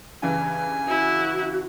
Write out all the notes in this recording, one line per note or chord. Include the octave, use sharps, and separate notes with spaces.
G2 C#3 E3 G#5
E4 F#4